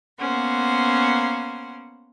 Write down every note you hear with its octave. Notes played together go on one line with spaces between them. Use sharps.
A#3 B3 C#4 C5 F#5